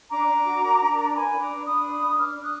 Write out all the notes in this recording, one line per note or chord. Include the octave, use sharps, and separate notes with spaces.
D4 A#5 D6
D4
F#4
A#4
D4
A#4
B4 G#5 B5
D4
A#5 D6
D4
D4 B5 D#6
B4
D4
D4 D6 F6
D4
D#6 F#6